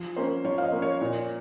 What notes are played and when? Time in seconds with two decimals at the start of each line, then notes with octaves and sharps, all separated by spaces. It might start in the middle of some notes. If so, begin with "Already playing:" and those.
Already playing: F3
0.16 A#3 C#4 C5
0.45 F3 C#5
0.58 F5
0.63 D#5
0.72 A#3 C#4
0.82 C#5
1.01 A#2